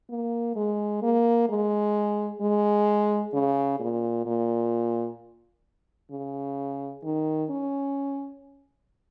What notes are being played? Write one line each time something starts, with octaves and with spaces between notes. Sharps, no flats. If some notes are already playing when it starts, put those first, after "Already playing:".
A#3
G#3
A#3
G#3
G#3
C#3
A#2
A#2
C#3
D#3
C#4